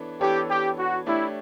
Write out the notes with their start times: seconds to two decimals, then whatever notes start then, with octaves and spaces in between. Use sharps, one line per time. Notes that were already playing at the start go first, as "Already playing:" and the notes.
Already playing: E3 B3 D4 A4 C#5
0.20 E3 B3 D4 G4 A4 C#5
0.49 G4
0.78 F#4
1.06 A3 D4 E4 G4 C#5